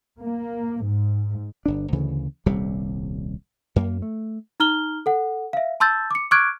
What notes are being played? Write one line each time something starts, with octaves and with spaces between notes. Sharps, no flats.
A#3
G#2
G1 D4
D2 C#3 E3
D#1 C2 C3 G3
F#2 A#3
A3
D#4 A#5 F6 G7
A4 F#5
E5 F5
A5 C6 E6 G6 A6
D6 C#7
C#6 D6 F6 F#6 G#6 D7